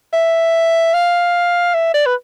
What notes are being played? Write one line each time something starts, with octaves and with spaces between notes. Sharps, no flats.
E5
F5
E5
D5
B4